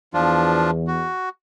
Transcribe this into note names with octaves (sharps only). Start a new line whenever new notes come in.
E2 F3 D4 F4
F#4